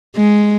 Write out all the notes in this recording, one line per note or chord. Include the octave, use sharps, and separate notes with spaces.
G#3